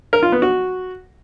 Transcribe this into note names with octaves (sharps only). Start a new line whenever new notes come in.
A#4
F4
B3
F#4